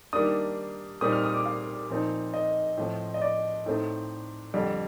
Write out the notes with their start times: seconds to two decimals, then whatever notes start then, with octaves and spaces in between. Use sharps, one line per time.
0.13 D#3 G3 A#3 D4 D#6
1.01 A#2 G3 C4 D#4 D#6
1.12 F6
1.24 D#6
1.34 D6
1.46 F5
1.90 A#2 F3 C4 D#4
2.34 D#5
2.77 A2 F3 C4
3.14 D#5
3.21 D5
3.66 A2 A3 C4 D#4
4.54 F2 D3 G3